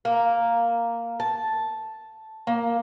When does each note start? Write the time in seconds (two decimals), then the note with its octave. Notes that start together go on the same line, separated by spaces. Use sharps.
0.05 A#3
1.20 A5
2.47 A#3